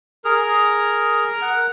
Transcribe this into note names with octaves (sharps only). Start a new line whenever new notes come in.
G#4 A#4 F6
F#5